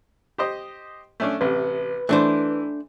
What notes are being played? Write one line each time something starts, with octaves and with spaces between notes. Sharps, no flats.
G4 C5 D#5
A3 C#4 D4
A1 C3 B4
E3 A3 D4 C5